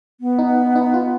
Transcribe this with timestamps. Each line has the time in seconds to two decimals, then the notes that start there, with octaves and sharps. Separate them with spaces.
0.21 B3
0.39 D#4
0.76 D#4
0.94 F4